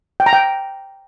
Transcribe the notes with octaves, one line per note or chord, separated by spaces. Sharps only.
G5
A#5
G5